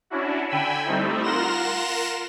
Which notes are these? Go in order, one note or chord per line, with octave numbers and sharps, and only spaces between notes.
C#4 D4 E4 F#4
D3 G5 G#5 B5 E6
G3 A3 C4 D#4 E4
F4 A#4 F#5 C6 A#6 E7